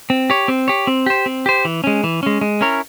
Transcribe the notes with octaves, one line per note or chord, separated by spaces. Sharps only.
C4
G4 C#5
C4
G4 C#5
C4
G4 C5
C4
G4 C5
E3
G#3 C#4
E3
G#3 C#4
G#3
C#4 E4 A#4 C#5